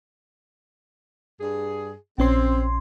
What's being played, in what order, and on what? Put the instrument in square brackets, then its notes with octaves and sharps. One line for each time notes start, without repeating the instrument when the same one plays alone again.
[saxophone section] G2 G#4
[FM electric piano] A#1 C#4 C6 [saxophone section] C4